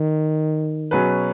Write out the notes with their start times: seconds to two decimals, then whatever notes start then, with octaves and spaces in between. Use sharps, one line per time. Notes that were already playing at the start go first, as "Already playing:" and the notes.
Already playing: D#3
0.91 B2 F#3 C#4 G#4 B4